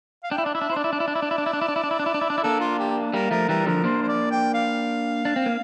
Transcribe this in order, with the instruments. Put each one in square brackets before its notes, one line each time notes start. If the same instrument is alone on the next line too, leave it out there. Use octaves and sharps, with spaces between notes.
[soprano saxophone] F5
[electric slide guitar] D4 [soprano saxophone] G5
[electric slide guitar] E4
[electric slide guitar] D4 [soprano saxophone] D5
[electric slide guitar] E4 [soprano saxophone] E5
[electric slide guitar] D4
[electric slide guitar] E4 [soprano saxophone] C5
[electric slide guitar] D4 [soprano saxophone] D5
[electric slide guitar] E4
D4
E4
D4
E4
D4
E4
D4
E4
D4
E4
D4
E4
D4
E4
D4
E4
D4
E4
D4
E4
[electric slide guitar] A#3 D4 [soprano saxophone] A4
[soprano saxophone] F4
G4
[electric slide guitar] G3 A#3 [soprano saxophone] A#4
[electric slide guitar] F3 A3 [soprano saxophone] A#4
[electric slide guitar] E3 G3 [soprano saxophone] A#4
[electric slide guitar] D3 F3 [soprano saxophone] A#4
[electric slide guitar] A#3 D4 [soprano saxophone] C5
[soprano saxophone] C5
D5
G5
F5
[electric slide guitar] D4
C4
A#3